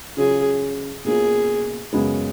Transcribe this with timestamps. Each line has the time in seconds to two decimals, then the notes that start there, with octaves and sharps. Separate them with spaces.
0.17 C#3 F#3 C#4 F4 G#4
1.05 B2 A#3 C#4 F4 G#4
1.93 F#2 C#3 G#3 B3